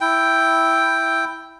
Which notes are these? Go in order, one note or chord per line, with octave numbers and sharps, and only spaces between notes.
E4 G5